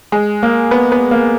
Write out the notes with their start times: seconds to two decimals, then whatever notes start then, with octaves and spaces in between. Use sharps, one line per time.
0.12 G#3
0.43 A#3
0.71 B3
0.92 B3
1.11 A#3